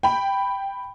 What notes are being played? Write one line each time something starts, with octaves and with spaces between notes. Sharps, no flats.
G5 B5